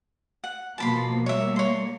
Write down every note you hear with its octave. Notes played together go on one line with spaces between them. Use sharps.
F#5
B2 F3 A#3 A5 B5 C6
G3 A#3 C#5 E5
C#5 C6